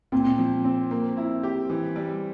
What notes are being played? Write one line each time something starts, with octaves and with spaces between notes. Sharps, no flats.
A#2 C4
F3
C4
A#3
E4
G4
E3
G3